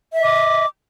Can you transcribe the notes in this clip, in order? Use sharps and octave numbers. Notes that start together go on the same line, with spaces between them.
D#5 E5 D6